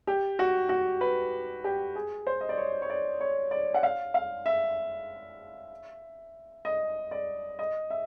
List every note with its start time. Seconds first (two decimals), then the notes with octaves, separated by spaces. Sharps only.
0.07 G4
0.39 F#4
0.69 F#4
1.01 B4
1.64 G4
1.95 G#4
2.27 C5
2.41 D#5
2.49 D5
2.58 C#5
2.82 C#5
2.90 D5
3.20 C#5
3.51 D5
3.74 F#5
3.83 F5
4.14 F5
4.46 E5
6.65 D#5
7.11 D5
7.59 D#5
7.90 E5